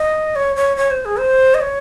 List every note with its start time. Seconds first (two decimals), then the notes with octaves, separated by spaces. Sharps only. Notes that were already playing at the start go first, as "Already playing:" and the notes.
Already playing: D#5
0.35 C#5
0.56 C#5
0.77 C#5
0.90 C5
1.05 G#4
1.18 C5
1.54 D#5
1.61 C#5